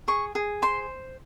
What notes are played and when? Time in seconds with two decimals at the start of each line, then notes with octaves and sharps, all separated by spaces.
0.08 G#4 C#6
0.35 G#4
0.62 C5 C6